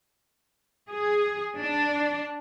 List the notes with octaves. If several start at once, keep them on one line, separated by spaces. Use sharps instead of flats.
G#4
D4